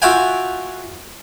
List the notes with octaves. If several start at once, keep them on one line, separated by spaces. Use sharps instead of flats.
F4 F#4 E5 F5 G5 G#5